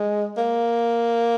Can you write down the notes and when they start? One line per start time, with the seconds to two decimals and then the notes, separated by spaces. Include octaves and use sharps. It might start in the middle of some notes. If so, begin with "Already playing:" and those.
Already playing: G#3
0.38 A#3